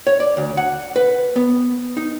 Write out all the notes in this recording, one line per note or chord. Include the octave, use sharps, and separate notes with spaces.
C#5
D5
D2
F#5
B4
B3
D#4